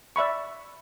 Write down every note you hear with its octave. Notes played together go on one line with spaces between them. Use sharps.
D5 E5 B5 C#6